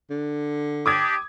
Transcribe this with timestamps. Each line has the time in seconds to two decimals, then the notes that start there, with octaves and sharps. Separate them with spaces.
0.10 D3
0.86 D4 G4 D6 D#6 G#6